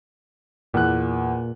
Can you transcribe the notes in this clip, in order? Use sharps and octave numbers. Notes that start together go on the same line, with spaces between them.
E2 A#2 F#6